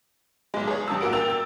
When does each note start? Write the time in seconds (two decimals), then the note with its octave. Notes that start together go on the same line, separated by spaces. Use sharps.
0.54 B1 G#3
0.67 G#4 C#5
0.88 G2 G4 A5 D#6 E6
1.01 B1 A#2 F#4 A#4 F#5 D7
1.13 A#4 G5 E6 A6 F7
1.30 A6